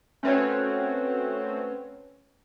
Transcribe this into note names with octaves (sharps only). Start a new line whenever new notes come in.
A3 C4 C#4 F#4 B4 C#5